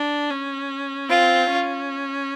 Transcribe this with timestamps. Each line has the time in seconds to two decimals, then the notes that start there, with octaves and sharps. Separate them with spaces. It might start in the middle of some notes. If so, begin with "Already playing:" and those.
Already playing: D4
0.30 C#4
1.09 C4 F4
1.49 C#4